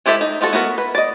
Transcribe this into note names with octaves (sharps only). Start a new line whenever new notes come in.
G#3 E4 G4 A4 E5
D#4
B3 F4 F#4 A4
B3 E4 F#4 A#4
B4
D5 D#5